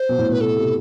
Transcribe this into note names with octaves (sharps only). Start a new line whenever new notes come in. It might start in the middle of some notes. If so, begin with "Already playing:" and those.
Already playing: C5
B2
A2
B2
B4
B2 A4
C3